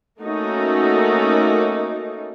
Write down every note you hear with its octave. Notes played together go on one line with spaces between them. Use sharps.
A3 A#3 C#4 D#4 F#4